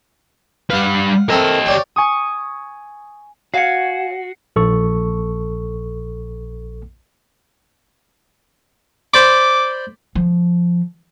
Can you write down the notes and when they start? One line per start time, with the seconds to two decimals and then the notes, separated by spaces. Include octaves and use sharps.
0.70 G3 B4 F5 F#5
1.29 A3 C4 G4 A#4 D#5
1.66 C#5 D5 G5
1.96 G#5 C#6 D#6
3.54 F#4 C#5 F5 G#5 C7 C#7
4.56 A#1 A4 C#6
9.14 C5 D5 B5 D6
10.15 F3